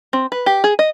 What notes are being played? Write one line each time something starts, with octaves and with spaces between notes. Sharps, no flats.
C4
B4
G4
G#4
D#5